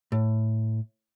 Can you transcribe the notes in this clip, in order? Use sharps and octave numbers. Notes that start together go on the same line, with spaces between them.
A2